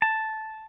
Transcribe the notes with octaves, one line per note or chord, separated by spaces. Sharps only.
A5